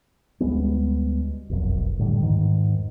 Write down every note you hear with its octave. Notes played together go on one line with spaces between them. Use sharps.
D2 G3 G#3 B3
F1 B1 F#2
A2 D3 G3
E2 G#2 D#3